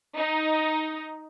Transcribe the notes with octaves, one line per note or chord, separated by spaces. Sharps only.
D#4